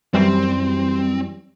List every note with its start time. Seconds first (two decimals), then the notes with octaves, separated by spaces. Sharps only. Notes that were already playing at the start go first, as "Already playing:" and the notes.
0.14 F#2 E3 G3 C4